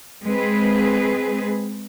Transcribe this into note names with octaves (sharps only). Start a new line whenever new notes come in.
G#3 C4 G#4 B4